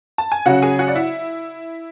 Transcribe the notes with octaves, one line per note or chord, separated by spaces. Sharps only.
A5
G#5
C#3 F#3 C#4 F#4 F#5
G#4 G#5
F#4 F#5
D5
E4 E5